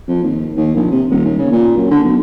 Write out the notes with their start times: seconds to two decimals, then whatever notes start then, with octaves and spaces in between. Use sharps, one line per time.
0.08 F2
0.24 D#2
0.57 D#2
0.76 A#1
0.91 C3
1.10 D#1
1.25 D#2
1.38 C#3
1.52 A#2
1.77 F#2
1.91 D3
2.04 B1